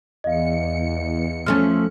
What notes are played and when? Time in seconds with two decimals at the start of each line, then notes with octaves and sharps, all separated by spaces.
0.24 E2 D#5 F5 C#7
1.46 F3 A3 C#4 F6